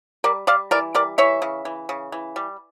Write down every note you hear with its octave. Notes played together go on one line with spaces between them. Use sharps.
G3 A#4 D5
G3 D5 F5
E3 A#4 D5
G3 A#4 D5
E3 C#5 E5
C#3
E3
C#3
E3
G3